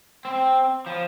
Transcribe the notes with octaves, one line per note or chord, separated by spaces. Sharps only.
C4
F3